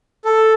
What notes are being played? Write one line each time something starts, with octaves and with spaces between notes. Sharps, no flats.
A4